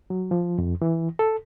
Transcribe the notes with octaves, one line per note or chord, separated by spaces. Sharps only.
F#3
F3
F2
E3
A4